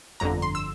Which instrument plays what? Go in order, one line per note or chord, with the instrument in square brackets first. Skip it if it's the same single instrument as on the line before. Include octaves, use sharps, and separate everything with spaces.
[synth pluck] G1 F2 D3 A#5
C6
E6